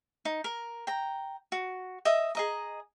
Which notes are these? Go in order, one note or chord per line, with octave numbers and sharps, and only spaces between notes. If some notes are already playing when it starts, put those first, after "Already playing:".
D#4
A#4
G5 A#5
F#4
D#5 E5 D#6
G#4 D#5 A#5